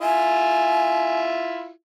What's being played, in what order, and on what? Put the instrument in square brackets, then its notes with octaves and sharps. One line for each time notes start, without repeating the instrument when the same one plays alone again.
[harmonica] E4 F4 E5 [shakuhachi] G#5